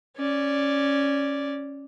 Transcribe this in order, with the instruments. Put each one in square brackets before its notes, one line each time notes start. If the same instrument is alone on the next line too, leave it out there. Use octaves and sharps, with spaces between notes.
[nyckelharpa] C#4 D5